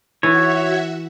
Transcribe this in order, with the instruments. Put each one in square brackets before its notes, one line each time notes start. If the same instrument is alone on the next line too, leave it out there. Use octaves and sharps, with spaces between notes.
[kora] E3 [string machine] F#4 E5 F#5 [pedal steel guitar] C#5